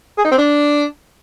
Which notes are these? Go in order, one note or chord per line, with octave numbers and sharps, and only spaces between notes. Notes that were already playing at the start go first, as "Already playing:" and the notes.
G#4
D#4
C4
D4